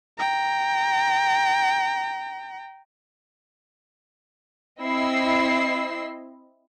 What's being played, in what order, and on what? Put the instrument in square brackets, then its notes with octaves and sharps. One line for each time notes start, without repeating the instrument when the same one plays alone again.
[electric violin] G5 A#5
[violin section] C4 E4 D#5 E6 C7